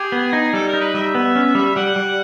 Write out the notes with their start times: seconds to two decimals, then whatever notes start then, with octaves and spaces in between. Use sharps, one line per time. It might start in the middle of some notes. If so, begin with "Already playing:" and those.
Already playing: G4 G#4
0.12 B3
0.33 D#4
0.53 G3 A4
0.68 A#4
0.74 D#4
0.81 B4
0.94 G3 E5
1.15 B3
1.36 C#4
1.55 G3
1.76 G3 F#5
1.96 G3